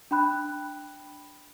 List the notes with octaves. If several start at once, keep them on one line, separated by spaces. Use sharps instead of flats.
D4 G5 B5 F#6